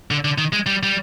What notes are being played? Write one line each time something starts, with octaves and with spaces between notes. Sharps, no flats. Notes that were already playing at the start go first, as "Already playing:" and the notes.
D3
D3
D#3
G#3
G3
G3